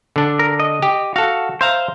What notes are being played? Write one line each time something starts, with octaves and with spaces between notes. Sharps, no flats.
D3 D4
A#4
D#5
G4
F#4 A4 F5
C5 E5 F5 A#5